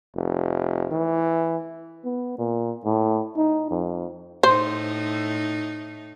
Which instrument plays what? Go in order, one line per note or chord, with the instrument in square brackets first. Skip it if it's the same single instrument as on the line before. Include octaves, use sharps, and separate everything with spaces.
[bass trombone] F1
E3
[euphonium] B3
A#2
A2
D#4
F2
[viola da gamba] A2 D#4 [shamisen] C5